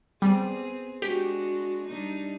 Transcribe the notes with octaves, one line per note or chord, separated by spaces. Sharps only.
G3 B3 C4 G#4
G#3 D4 F#4 G4
G3 D4 D#4